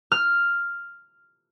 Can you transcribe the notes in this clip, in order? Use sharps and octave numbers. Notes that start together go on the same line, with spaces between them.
F6